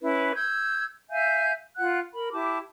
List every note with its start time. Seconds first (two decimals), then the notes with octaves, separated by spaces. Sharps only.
0.01 C#4 E4 B4
0.35 E6 G6 G#6
1.10 E5 F5 G#5 G6
1.78 F4 F#5 F#6
2.13 A#4 B5
2.33 E4 G4 A5 D6